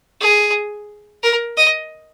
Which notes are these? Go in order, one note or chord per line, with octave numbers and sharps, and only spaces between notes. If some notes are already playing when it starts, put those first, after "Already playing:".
G#4
A#4
D#5